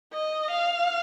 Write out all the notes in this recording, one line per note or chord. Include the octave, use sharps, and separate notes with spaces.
D#5
F5